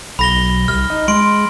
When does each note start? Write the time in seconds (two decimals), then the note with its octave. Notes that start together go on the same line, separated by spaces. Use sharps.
0.19 B1 B5 A#6 G7
0.68 C2 F6
0.90 D#4
1.08 G#3 C6 D7